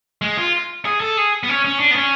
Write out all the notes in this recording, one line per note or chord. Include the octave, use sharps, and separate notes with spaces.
G#3
F4
G#4
A4
G#4
B3
C#4
C#4
D4
B3
C#4